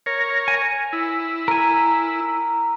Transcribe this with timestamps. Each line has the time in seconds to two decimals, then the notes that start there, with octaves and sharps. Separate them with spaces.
0.06 A#4 C#5
0.48 G#5
0.93 E4
1.48 A#4 G#5